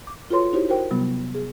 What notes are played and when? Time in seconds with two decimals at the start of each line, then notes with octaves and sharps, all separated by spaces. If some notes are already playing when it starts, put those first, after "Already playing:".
0.07 D6
0.30 F4 F#4 A4 B4 C#5 C6
0.53 D#4 E4 F#4 G4 C5 C#5
0.69 F#4 A#4 C5 G5
0.91 C3 F#3 G3 B3
1.35 G#4